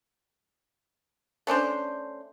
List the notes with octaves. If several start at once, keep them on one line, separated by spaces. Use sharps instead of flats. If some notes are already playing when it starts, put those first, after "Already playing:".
A3 C#4 D4 C5